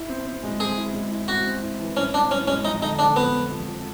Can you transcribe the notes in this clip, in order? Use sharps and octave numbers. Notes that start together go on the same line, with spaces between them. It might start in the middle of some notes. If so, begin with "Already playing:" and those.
Already playing: E4
C4
C4
G#3
C4 G#4
E4
G#3
E4
C4 F#4
C4
E4
E3
C#4 E4
C4 D4
E3 C#4
G#3 C#4
F2 D#4
D3 D#4
D3 D4
F2 B3
F2
F2
F2